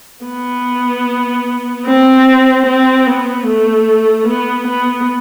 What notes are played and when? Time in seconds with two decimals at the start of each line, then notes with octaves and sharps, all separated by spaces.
0.25 B3
1.86 C4
2.66 C4
3.07 B3
3.47 A3
4.28 B3
4.68 B3